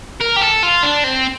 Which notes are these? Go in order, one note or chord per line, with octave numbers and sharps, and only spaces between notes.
A#4
G4
A4
F4
D4
C4